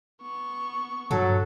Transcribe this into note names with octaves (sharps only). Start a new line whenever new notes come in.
B3 C#6
G2 F#3 A4